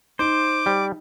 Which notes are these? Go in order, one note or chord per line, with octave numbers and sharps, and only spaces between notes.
D#4 C5 D6
G3